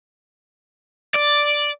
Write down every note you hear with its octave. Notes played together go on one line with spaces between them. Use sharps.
D5